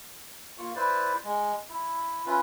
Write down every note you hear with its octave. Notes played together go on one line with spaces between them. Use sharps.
A#3 F4 C#6
E4 B4 C5 D5
G#3
E4
C#4 E4 F4 B4